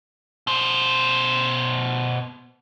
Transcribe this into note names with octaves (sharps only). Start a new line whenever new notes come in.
B2 C5